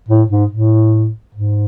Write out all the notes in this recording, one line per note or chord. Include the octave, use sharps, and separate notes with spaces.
A2
G#2
A2
G#2